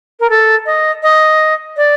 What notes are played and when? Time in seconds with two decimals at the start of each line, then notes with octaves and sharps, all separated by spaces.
0.20 A#4
0.30 A4
0.66 D#5
1.03 D#5
1.77 D5